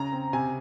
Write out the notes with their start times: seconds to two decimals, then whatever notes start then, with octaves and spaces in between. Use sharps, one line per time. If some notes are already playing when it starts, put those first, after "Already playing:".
Already playing: C#3 A#5
0.13 C4
0.33 C3 G#5